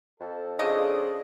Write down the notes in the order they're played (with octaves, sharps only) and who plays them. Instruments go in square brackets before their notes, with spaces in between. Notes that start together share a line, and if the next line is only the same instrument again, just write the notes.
[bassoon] F2 [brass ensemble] A4
[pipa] C#3 D#5 [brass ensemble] D4 F4 A4 [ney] G#4